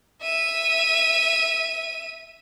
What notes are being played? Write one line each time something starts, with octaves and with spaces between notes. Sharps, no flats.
E5 D#7